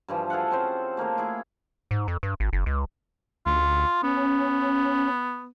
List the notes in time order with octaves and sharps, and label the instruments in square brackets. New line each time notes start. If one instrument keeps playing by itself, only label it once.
[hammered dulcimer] G2 E3 F3
G#4 A4 F5 F#5
C4 C#4 C5
A3 A#3 G#4 C#5
E4 G#4
[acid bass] G#2
F2
G2
G#1
F#1
C#2
[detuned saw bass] D2 [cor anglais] F4
[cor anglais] B3 [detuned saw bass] C#4